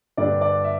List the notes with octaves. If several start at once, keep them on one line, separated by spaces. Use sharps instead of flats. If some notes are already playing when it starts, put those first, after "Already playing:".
G2 D3 G3 D4 D5
D5
E5